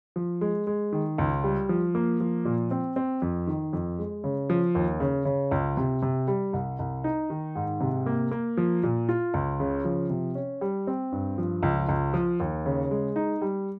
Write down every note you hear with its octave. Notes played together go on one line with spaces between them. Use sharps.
F3
G#3
G#3
D#3
C#2
G3
F3
A#3
F3
A#2
C4
C4
F2
D#3
F2
G#3
C#3
F3
D#2
C#3
C#3
C#2
C3
C3
G3
C2
C2
D#4
D#3
G#2
C3
A#3
A#3
F3
A#2
F4
C#2
C#3
F3
C3
C#4
G3
C4
G2
F3
C#2
C#2
F3
D#2
C#3
G#3
D#4
G3